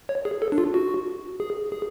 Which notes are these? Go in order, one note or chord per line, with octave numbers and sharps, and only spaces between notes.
C#5
G#4
A4
D4
F4
F#4
G#4
G#4